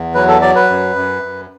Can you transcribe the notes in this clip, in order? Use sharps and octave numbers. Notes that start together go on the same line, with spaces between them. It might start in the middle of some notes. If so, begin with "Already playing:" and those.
Already playing: E2
F#3 B4
A4
F#3 D5
B4
F#2
F#2
F#2